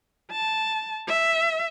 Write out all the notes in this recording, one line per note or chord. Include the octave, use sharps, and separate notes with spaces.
A5
E5